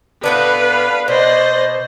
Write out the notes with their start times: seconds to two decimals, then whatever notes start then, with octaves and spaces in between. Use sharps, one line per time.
0.23 A2 B3 D4 B4 F5
1.08 B2 C5 D5 D#5